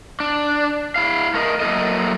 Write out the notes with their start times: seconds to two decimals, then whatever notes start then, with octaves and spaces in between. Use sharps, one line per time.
0.20 D4
0.96 E4 F5
1.34 A3 A#4 D#5
1.60 F#3 A#3 E4 A4 D#5